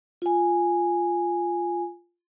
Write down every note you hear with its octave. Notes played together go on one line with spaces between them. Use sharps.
F4 G#5